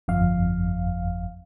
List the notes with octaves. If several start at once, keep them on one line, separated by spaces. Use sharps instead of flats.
G1 F2 F5